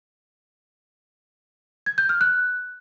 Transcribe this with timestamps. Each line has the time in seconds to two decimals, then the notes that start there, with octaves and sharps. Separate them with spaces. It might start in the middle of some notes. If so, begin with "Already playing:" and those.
1.86 G#6
1.98 G6
2.09 F6
2.21 F#6